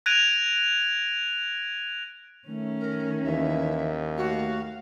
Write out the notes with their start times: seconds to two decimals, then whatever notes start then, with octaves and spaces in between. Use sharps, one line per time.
0.06 F#6 G#6 A#6 D7 D#7 F7
2.48 D#3 A3 C#4
2.80 A#4
3.24 D#2 E3 E5
4.17 A3 F#4 F5